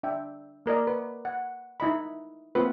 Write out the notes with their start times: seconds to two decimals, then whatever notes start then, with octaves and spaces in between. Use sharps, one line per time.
0.03 D4 E5 G5
0.66 A#3 A#4 D5 D#5
0.87 B4
1.25 F#5
1.80 D#4 E4 D#5 B5
2.55 A#3 C4 F4 B4